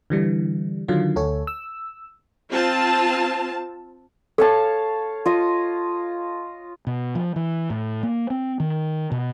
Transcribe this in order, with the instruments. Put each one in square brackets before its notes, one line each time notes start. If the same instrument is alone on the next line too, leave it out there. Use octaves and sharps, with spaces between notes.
[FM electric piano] D3 E3 G3
D3 D#3 F#3 F4
D2 A4 C#5
E6
[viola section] C4 F4 A5
[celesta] A4 [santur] C#5 F5 A5
[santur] F4 D#5
[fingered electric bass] B2
F3
E3
A2
A#3
C4
D#3
B2